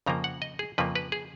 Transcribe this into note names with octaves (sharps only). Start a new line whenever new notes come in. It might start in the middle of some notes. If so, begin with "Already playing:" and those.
F2 C#3 F3 A#3 A#5
F#5
D#5
G#4
F2 C#3 F3 A#3 B4
B4
G#4